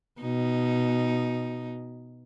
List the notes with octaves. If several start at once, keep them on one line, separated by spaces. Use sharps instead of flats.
B2 D#4